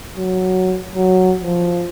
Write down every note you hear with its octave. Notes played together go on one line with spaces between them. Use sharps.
F#3
F#3
F3